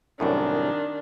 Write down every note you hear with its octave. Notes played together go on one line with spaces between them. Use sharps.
C2 F#2 A2 D#3 D4